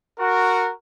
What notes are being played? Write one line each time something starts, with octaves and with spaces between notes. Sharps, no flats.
F#4 A#4